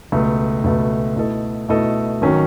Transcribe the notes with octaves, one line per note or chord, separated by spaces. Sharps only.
C#2 B2 A3
C#2 B2 A3
B2 A3 E4 A4 D#5
B2 A3 E4 A4 D#5
G#1 D#3 F#3 C#4